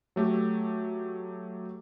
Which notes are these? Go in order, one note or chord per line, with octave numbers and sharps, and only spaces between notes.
F#3 A3 G4